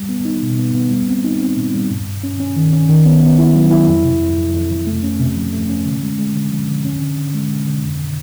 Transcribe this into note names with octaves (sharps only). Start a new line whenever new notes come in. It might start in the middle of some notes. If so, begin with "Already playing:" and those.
Already playing: G3
B3
D#4
B2
B3
B3
G3
C4
D#4
C4
A#2
G3
G2
G2
C#4
C#4
D#3
C#4
D#3
B3
B3
E4
F#3
E4
F2
C3
F2
F2
F2
F2
A3
C#4
C3
F3
A3
C#4
D3
G#3
G#3
D3
F3
D3
C#4
D3
D3
G#3
D3
D3
F2